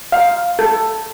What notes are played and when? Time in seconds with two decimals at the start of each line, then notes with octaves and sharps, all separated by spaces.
0.12 F5
0.59 A4